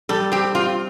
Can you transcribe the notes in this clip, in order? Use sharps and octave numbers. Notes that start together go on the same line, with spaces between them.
G3 A4
C4 G4
C4 F4